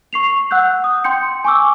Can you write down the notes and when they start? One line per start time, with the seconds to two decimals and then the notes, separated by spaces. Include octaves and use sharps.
0.13 C#6 C7 F7
0.51 F#5 E6 F#6 G6
0.84 D#6
1.04 G5 C6 G6 C#7
1.44 G#5 C#6 D6 E6